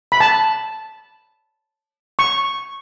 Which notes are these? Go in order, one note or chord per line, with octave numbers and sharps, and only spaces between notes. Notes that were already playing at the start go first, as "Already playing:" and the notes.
B5
A5
C#6